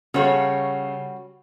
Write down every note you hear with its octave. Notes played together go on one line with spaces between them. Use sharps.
C#3 G3 F#4 A4 C#5 F5